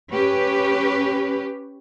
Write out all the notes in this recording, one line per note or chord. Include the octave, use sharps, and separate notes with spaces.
C#4 G4 B4